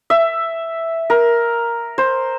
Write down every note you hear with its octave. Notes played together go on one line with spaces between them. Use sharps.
E5
A#4
C5